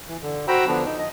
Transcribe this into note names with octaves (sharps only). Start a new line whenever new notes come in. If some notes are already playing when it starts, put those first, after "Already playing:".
E3
D3
F#4 C5 G5 A#5 B5 E6
D3 F3 B3 D4
D#4
D#5